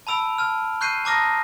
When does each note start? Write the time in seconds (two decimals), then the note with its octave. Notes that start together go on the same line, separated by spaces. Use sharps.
0.07 A5 B5 E6 D7 F7
0.38 A5 F6
0.81 C#6 F#6 G6 C7 D#7
1.05 A5 A#5 D6 D#6 F6 A#6